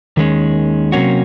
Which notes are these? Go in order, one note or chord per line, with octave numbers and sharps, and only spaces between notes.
D#2 D#3 G#3 C#4
C3 F#3 A#3 C#4 F#4